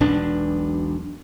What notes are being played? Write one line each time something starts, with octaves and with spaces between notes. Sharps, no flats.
E1 B1 B3 D4